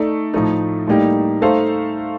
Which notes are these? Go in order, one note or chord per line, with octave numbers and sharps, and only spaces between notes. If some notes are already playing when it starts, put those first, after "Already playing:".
Already playing: A3 D#4 A4 D5
A2 F3 A3 D#4
A2 G3 A#3 D#4 G4
A3 D#4 A4 C5 F5